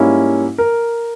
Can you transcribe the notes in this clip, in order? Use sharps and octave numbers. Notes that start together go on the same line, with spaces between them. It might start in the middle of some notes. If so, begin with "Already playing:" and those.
Already playing: G#2 G3 A#3 C#4 E4
A#4